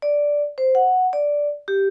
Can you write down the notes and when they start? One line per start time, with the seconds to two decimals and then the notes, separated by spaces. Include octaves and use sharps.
0.02 D5
0.58 C5
0.75 F#5
1.13 D5
1.68 G4